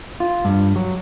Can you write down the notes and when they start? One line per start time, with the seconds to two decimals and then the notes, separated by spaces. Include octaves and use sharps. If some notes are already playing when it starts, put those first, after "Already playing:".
0.20 F4
0.45 G2
0.76 F#3